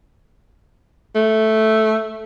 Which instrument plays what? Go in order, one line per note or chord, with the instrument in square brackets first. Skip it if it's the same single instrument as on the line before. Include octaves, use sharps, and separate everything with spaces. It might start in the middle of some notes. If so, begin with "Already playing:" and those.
[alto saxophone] A3